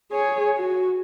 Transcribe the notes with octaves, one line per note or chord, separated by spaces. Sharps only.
G#4 C#5
F#4